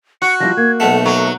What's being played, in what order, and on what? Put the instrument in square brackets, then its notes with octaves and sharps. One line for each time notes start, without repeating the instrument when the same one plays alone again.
[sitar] F#4 [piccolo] C#7
[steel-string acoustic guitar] F3 G3 E4 [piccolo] A#6
[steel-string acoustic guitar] A#3 [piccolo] G#6
[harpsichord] B1 A3 [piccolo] F#5
[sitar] F#3 [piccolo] C#6